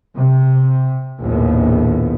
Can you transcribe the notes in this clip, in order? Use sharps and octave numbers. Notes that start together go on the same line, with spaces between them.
C3
A#1 D#2 A2 B3